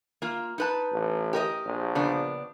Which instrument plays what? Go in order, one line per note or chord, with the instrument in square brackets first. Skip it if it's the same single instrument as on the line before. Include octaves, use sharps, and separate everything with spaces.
[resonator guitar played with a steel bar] A#3 F4
D#4 B4 A5
[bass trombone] A1
[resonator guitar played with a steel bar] G4 A#4 D#5
[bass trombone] A#1
[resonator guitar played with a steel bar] C#3 B3 D4